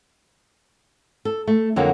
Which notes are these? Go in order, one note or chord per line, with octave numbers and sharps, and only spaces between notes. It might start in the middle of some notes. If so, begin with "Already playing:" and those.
A4
A3
F2 D3 F#3 A#3